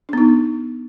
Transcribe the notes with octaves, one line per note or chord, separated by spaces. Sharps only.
B3 D4 D#4